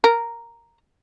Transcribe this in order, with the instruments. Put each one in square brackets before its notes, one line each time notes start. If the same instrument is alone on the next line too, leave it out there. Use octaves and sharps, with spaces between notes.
[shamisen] A#4